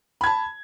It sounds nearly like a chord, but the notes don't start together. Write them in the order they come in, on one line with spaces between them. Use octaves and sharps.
B5 G#6 A5